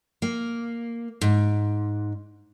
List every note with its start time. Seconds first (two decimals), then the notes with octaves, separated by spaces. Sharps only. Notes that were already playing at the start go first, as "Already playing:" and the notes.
0.22 A#3
1.21 G#2